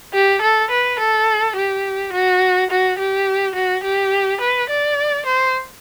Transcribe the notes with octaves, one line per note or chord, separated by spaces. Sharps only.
G4
A4
B4
A4
G4
F#4
F#4
G4
F#4
G4
B4
D5
C5